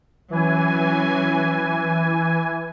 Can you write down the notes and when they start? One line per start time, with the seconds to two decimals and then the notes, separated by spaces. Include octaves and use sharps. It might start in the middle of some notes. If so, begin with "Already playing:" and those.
0.30 E3 F#3 C#4 G#5